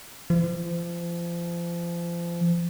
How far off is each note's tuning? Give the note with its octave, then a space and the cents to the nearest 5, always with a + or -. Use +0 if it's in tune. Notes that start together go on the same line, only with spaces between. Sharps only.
F3 -30